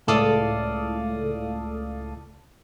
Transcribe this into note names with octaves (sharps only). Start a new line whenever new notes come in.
C#2 A2 A4 D5 F5 D#6